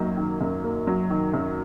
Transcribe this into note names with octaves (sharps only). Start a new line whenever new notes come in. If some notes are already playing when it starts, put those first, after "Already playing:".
Already playing: F#2 D#3 F#3 A#3
D#3
F#2
A#3
F#3
D#3
F#2